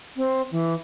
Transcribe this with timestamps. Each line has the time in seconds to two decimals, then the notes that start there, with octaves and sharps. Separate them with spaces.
0.16 C4
0.51 E3